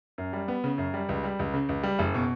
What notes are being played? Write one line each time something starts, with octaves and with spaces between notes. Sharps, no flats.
F#2
G3
B3
C#3
F#2
G3
C#2
G3
C#2
C#3
C#2
G3
F#1
B2